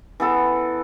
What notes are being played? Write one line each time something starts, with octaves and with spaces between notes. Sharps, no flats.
E3 B3 A4